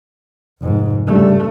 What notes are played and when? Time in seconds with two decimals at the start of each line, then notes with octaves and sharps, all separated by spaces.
0.61 F1 G#2
1.07 C#2 G2 A3 D4